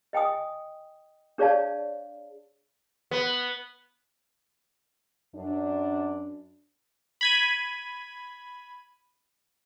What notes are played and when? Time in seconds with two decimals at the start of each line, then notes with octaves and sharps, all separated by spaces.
0.13 D#5 G5 G#5 D#6
1.38 D4 G#4 C#5 D5 F5 A5
3.11 B3
5.36 F#2 D4
7.21 B5 G#6 D#7